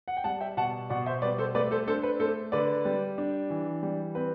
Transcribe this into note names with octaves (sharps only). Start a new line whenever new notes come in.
F#5
G5
G3 F#5 A5
E5 G5
B2 F#5 A5
B2 D5 F#5
C5 E5
G3 B4 D5
A4 C5
A3 B4 D5
A4 C5
D4 A4 C5
B4
A3 A4 C5
D3 B4 D5
G3
D4
E3
G3
C4 B4